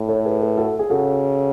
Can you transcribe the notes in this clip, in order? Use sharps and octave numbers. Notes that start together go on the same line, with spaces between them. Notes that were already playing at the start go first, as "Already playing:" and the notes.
Already playing: A2
A4 C#5
G#4 B4
G#4 B4
F#4 A4
G#4
C#3 F#4 A4